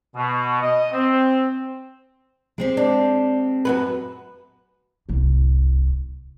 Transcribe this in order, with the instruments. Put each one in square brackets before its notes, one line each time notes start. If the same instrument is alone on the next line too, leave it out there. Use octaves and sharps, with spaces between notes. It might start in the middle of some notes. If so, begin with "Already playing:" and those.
[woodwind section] B2
D#5
C4
[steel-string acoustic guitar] G#3 C4 G4
[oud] D4
F#2 F#4 B4
[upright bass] D1 C2